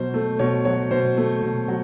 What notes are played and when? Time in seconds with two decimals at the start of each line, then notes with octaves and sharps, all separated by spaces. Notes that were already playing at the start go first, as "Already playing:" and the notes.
Already playing: B2 F#3 C5
0.14 A3
0.39 B2 C#5
0.65 F#3 C#5
0.91 B2 C5
1.17 A3
1.42 B2
1.68 F#3